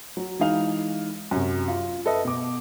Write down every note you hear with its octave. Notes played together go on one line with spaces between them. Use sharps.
F#3
E3 G#3 D#4 F5 F7
F#2 C3
F4
A4 B4 D#5 E5
B2 D6